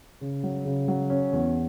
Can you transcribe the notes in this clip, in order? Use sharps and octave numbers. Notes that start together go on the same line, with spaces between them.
C#3
F#3
C#3
F#3
C#4
E2